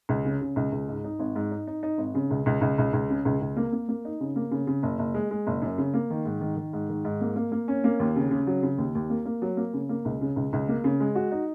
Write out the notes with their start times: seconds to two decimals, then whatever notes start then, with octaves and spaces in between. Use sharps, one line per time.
0.09 C#2
0.25 C#3
0.41 C#3
0.56 C#2
0.72 C#2
0.88 G#2
1.04 D#4
1.19 G#1
1.36 G#2
1.51 D#4
1.67 D#4
1.83 D#4
1.98 G#1
2.15 C#3
2.31 C#2
2.46 C#2
2.61 C#2
2.78 C#2
2.93 C#2
3.10 C#3
3.25 C#2
3.41 C#2
3.57 A#3
3.73 A#3
3.89 A#3
4.05 D#4
4.20 C#3
4.36 A#3
4.51 C#3
4.67 C#3
4.83 F#1
4.99 F#1
5.14 G#3
5.31 G#3
5.47 F#1
5.62 F#2
5.78 C#3
5.94 A#3
6.10 D#3
6.25 G#2
6.41 D#3
6.57 D#3
6.73 G#2
6.89 D#3
7.05 G#2
7.21 A#3
7.36 A#3
7.52 A#3
7.68 C#4
7.84 A#3
8.00 D#2
8.16 C#3
8.31 C#3
8.47 F#3
8.63 C#3
8.78 D#2
8.95 D#2
9.10 A#3
9.25 A#3
9.42 F#3
9.57 A#3
9.73 C#3
9.89 A#3
10.05 C#2
10.21 C#3
10.36 C#2
10.53 C#2
10.68 A#3
10.84 C#3
11.00 G#3
11.15 F#4
11.31 D#4